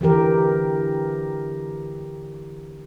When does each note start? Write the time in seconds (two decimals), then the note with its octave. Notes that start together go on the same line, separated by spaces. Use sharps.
0.01 D3 E3 G4 A#4